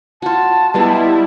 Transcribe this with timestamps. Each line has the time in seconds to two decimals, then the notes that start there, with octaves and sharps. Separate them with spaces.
0.22 F4 F#4 A5
0.74 G3 G#3 B3 E4 F4